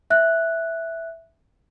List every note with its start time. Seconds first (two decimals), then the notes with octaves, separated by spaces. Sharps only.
0.10 E5 F#6